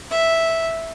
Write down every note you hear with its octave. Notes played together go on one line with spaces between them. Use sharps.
E5